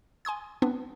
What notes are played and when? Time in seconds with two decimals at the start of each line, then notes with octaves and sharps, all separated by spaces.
0.25 G#5 C6 D#6 G#6
0.62 B3 C4 D4 B4